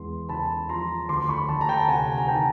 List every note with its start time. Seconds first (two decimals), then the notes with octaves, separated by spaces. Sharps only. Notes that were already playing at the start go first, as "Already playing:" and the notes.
Already playing: E2 G#3 C6
0.29 C#3 A5 B5
0.69 F3 A#5 C6
1.08 D2 C6 D6
1.29 B5 C#6
1.48 D2 A5 B5
1.61 A#5
1.68 G5 A5
1.88 C3 F#5 G#5
2.18 A#5
2.28 D#3 G5 A5